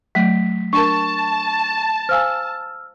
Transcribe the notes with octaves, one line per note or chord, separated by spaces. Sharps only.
F#3 A3 B6
D4 A#4 A5 C#6
C5 F5 G#5 E6 F6